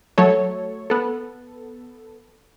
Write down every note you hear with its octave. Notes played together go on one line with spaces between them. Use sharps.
F#3 A3 A4 C#5
B3 A4